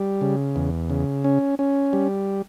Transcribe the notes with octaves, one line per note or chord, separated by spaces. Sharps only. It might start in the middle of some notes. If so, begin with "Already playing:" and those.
Already playing: G3
C#3
E2
C#3
C#4
C#4
G3